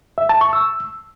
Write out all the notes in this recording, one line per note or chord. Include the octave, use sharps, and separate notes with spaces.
E5
A5
C#6
E6